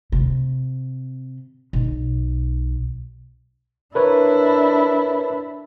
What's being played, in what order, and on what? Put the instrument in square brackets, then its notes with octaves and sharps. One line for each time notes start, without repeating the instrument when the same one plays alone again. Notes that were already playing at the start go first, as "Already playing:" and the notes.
[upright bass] C3
B1
[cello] D4 E4 [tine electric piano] A#4 B4 C#5